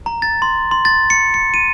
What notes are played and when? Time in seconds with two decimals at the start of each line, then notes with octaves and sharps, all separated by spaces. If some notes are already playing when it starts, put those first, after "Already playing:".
0.06 A#5
0.22 A6
0.42 C6
0.71 C6
0.85 A6
1.10 C#7
1.34 C#7
1.54 D#7